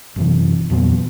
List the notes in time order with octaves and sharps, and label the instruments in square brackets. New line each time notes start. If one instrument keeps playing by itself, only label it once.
[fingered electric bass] F#1 C3 E3
E2 A#2 F#3 B3